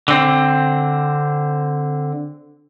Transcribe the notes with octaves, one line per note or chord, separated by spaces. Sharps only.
D3 C4